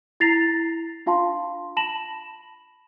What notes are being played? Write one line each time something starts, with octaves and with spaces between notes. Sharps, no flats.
E4 A#5 A6 A#6 C7 F7
D4 F4 F5 A5 C6
A5 B5 A#6 E7 F#7